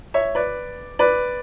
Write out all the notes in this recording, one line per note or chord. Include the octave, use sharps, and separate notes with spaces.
C#5 E5
B4 D5
B4 D5